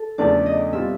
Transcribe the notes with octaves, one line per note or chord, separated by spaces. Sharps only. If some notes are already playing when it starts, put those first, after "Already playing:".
Already playing: A4
E2 C#3 F3 A3 D4 D5
D#5
B2 G3 C4 F4 E5